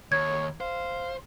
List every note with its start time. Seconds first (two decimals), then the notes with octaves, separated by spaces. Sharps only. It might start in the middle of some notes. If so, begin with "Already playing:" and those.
0.12 D#2 C#5 G#6
0.60 C5 F5